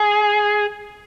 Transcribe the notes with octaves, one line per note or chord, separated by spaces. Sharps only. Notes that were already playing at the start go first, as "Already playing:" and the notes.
Already playing: G#4